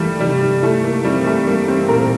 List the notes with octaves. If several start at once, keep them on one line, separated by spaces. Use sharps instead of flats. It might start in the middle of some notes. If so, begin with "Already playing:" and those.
Already playing: E3 G3 A3 A#3
C3 G3
A3 E4
A#3
G3 C4
A3
G3 A#3
C4
A#2 A#4